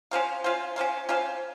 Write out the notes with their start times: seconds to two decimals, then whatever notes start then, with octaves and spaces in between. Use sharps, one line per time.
0.11 C#4 F4 C5 F5
0.44 C#4 F4 C5 F5
0.76 C#4 F4 C5 F5
1.09 C#4 F4 C5 F5